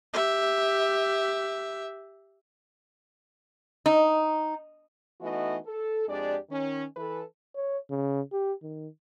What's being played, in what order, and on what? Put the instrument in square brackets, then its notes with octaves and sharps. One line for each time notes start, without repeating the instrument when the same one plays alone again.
[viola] G4 E5
[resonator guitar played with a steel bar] D#4
[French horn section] E3 A3 B3 D#4 F#4 D#5
A4
F2 G#3 D4 G4 D5
D#3 C#4
E3 A4 B4
[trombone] C#5
C#3
G4
D#3